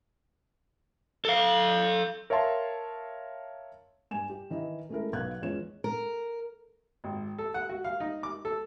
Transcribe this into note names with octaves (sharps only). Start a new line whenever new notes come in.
A4 F5
A#4 C#5 E5 F5 A5 C6
G2 G#5 E7
G4
D#3 E3 D#4 E4
G#3 A3 C#4 E4 A4 A#4
B1 B3 F5 F#5 F#6 G#6
E2 G#3 C#4 F4 C#5 E7
A#4
G#1
A4
F#5
F#4
F5
D#4
D6
A4